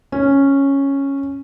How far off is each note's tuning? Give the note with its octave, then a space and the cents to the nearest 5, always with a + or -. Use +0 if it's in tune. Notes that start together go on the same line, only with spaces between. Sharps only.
C#4 -5